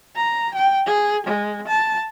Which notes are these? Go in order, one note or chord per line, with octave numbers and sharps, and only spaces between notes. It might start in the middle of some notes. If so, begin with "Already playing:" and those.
A#5
G5
G#4
G#3
A5